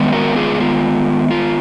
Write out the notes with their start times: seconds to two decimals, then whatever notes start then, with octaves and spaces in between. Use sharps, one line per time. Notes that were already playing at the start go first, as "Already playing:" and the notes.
Already playing: D#3 G#3 B3
0.12 F#4 A#4
0.36 F4 G#4
0.60 F4
1.31 F4